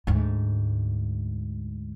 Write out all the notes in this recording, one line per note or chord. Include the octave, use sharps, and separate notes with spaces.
D2 G#2